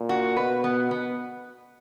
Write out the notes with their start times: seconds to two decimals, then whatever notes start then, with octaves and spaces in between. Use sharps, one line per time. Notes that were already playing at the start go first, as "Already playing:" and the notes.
Already playing: A#2
0.09 F#4
0.37 B2 B4
0.64 B3
0.91 B3